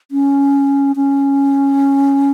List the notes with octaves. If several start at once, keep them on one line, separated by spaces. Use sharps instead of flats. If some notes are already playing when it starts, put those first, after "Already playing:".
C#4
C#4